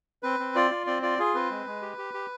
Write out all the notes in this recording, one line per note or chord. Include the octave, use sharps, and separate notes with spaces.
C4 B4
C4
F4 D5
F4
C4 D5
F4 D5
F4 G#4
C4 B4
G#3
G#3
G4
G4
G4